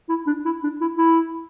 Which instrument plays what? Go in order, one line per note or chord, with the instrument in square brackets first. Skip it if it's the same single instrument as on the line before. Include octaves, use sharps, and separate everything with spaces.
[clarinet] E4
D4
E4
D4
E4
E4